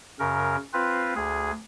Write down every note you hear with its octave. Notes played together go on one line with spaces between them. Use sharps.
F#2 C#3 A#4
C4 F4 B4
D2 G#4